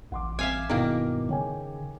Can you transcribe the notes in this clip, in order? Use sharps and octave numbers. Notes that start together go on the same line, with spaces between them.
A1 F#5 C6 D6
C4 E5 F5 G#5
G2 B2 D#3 A#3 B3 E4
C#3 C#5 G5 G#5